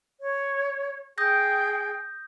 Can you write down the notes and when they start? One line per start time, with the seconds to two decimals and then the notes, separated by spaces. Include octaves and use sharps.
0.20 C#5
1.18 G#4 G5 D#6 G6 A#6